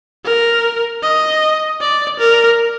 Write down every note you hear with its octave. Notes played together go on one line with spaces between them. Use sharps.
A#4
D#5
D5
A#4